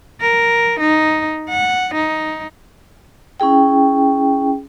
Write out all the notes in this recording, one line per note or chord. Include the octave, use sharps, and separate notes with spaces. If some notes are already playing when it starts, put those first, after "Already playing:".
A#4
D#4
F#5
D#4
C#4 E4 G#4 G5